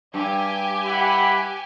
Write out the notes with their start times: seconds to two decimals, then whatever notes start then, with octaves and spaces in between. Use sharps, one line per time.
0.14 G2 G4 G#5
0.86 E4 F#5 B5